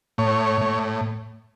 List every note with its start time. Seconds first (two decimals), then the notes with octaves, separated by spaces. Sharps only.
0.18 A2 C#5
0.61 A2